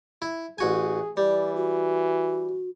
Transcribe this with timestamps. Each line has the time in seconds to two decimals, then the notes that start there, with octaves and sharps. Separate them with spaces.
0.22 E4
0.58 A1 F#4 G#4 G#5
1.17 E3 G3 D5
1.55 F#4